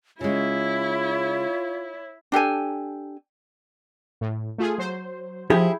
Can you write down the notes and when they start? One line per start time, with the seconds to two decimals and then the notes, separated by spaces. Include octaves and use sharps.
0.21 C#3 G#3 E4 F4 C#5
2.32 D4 G4 A4 G#5
4.21 A2
4.58 A3 F4 G#4
4.78 F#3 C5
5.50 F3 E4 G4 G#4